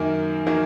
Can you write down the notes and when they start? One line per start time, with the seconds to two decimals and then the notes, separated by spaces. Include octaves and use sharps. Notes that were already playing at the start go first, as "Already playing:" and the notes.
Already playing: F#2 D#3 F#3 A#3
0.46 D#3 F#3 A#3